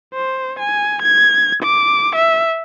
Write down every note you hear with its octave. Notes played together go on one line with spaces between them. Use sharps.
C5
G#5
G#6
D6
E5